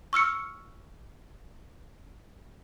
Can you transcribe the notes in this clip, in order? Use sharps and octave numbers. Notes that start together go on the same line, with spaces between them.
C#6 E6 F6 C#7